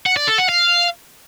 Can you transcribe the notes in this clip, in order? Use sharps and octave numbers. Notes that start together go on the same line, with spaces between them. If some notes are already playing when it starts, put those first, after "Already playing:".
F#5
D5
A4
F#5
F5